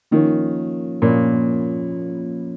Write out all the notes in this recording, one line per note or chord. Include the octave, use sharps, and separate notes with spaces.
D#3 F3 A#3 C#4 F4 C#5
A#2 F3 A#3 C#4 F4 C#5